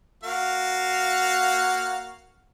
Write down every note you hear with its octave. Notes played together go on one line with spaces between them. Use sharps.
A#3 F#4 F5